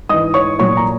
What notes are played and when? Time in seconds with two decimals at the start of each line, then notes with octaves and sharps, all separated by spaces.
0.09 G#2 E3 D#5 D#6
0.34 C#5 C#6
0.59 A#2 F#3 C#5 C#6
0.77 A#5